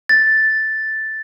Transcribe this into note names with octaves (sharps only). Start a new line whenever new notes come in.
A6